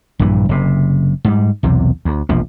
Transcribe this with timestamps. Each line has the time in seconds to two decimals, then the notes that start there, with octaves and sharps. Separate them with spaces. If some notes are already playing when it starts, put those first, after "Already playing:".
0.19 A#1 G2 A#2 E3
0.49 F#1 C3
1.25 G#2 G3
1.63 B1 E2 C3
2.05 D2
2.29 E1 A#1 F3